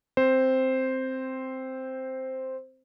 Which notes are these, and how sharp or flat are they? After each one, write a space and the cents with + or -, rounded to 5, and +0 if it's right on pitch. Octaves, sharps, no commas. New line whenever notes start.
C4 +0 C5 +0